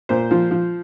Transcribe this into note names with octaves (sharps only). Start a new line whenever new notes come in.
A#2 C5
F3
F3